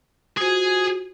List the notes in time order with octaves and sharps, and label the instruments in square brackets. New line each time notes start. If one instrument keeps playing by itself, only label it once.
[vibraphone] F4 F#4 C5 [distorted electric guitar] G#4 G#5